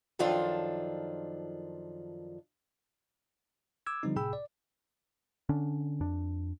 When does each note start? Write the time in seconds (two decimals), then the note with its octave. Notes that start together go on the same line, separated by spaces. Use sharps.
0.19 F#2 D#3 F3 D4 F4 A4
3.86 D6 E6 G#6
4.03 D3 F3 G3 C4 D#4
4.16 A2 C3 G#4 G5 B5 E6
4.33 D5
5.49 D3 C#4 D4
6.00 F2 D4